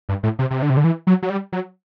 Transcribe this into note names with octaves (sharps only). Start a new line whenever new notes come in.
G2
A2
C3
C3
D3
C3
D3
E3
F#3
F#3
G3
F#3